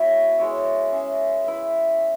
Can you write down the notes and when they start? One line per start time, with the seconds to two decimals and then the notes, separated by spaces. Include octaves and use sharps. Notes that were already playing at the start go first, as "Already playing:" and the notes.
Already playing: B3 E4 F#4 C#5 E5
0.38 G#3 E4 C#5 E5
0.92 C#4 G#4 E5
1.44 E4 B4 E5